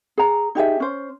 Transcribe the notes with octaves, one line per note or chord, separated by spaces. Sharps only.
G#4 A#5
D#4 G4 G#4 E5
C#4 C5